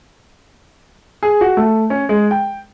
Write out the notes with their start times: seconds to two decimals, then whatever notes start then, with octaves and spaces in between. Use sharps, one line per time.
1.23 G#4
1.41 F#4
1.57 A3
1.90 C#4
2.09 G#3
2.31 G5